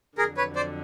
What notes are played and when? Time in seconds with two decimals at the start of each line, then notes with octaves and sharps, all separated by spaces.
0.18 F2 D3 F#3 G#4 A#4
0.37 B4 C#5
0.56 C5 D5